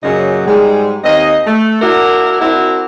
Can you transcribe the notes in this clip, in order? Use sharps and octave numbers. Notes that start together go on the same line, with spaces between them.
F#2 A#2 C#3 F#3 D#5
G#2 G3 G#3
D#2 C4 D#5
A3
A#3 D4 E4 F#4 A#4
C4 D4 E4 F#4 A#4